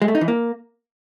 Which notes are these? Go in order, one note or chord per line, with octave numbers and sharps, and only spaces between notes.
G#3
A3
D#4
E3
A#3